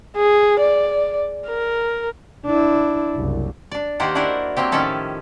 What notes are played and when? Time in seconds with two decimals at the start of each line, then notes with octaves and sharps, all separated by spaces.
0.16 G#4
0.60 D5
1.47 A#4
2.45 D4 E4
3.14 F#1 C2
3.71 D4 D5
4.00 D#3 A#3 G4 C5 D5 F#5
4.15 D4 E4 F#4 A#4 C5 D5
4.57 F#3 A#3 C4 G4
4.72 A2 D#3 F3 C#4 A4 E5